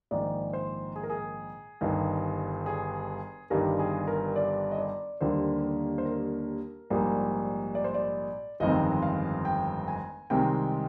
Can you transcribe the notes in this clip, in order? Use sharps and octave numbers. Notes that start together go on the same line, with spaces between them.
A#1 G#2 D#3 D5
C5
G#4
A#4
G#4
G1 G2 D#3
G#4
G1 G2 D#3 G3 A#4
G#4
A#4
D5
D#5
D5
D#2 D3 G3 A#3 C5
A#4
C5
A#4
A#1 G#2 G3 A#3
D5
C5
D5
G1 F2 D#3 G#3 C4 D#5
F5
G5
G#5
C2 C3 D#3 G#3 C4 G5